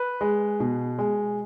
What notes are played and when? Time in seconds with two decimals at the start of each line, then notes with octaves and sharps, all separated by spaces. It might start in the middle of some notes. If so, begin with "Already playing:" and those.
Already playing: B4
0.21 G#3
0.60 B2
0.99 G#3